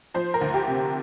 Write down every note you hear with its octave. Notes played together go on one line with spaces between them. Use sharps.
F3 C5
A#4
D2
G4
C3